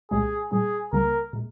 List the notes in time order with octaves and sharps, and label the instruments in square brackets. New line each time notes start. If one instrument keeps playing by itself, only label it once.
[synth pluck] C2 A#2 G#3 C#4 G4 [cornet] G#4
[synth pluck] A#2 G3 C#4 [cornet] G#4
[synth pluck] C#2 C#3 G3 A#3 [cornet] A#4
[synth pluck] A#2 G#3